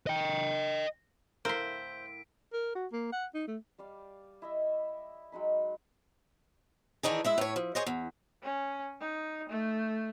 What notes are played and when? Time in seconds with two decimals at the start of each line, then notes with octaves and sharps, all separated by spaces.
0.07 D#5 G5
1.45 A2 E4 A#4 C5 F5 C6 B6 D7
2.53 A#4
2.75 F#4
2.93 A#3
3.12 F#5
3.34 D#4
3.48 A3
3.78 G3 D5 F5
4.42 E4 D#5 E5
5.32 F#3 G#3 D#4 B5
7.03 D#3 E3 D4 D#4 G#4
7.24 G#3 E4 E5
7.38 A2 C#5
7.56 F3
7.75 G#4 C5 C#5 D#5
7.87 E2
8.43 C#4
9.01 D#4
9.50 A3